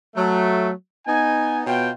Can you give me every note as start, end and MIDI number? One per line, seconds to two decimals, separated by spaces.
0.16 0.70 54
0.16 0.70 57
1.07 1.61 59
1.07 1.61 63
1.07 1.61 80
1.66 1.90 47
1.66 1.90 59
1.66 1.90 65
1.66 1.90 73
1.66 1.90 79